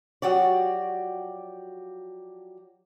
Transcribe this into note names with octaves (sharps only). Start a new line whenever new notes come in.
F3 F#3 F#4 G4 D5